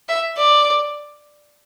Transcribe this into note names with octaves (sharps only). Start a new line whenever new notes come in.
E5
D5